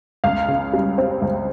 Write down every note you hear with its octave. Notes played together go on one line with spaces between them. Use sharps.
C#2 F5
C#3
G3
C4
C#2